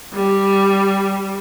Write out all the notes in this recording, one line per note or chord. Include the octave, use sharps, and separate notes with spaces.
G3